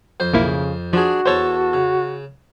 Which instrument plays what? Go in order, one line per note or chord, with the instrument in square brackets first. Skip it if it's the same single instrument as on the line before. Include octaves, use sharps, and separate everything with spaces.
[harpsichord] F2 C5
[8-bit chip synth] B1 A#3 E4 [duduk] C#3
[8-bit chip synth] F3 [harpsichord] D4 G#4 [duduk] F#4
[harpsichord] E2 A4 A5 [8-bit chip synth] C5 C#5
[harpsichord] C#3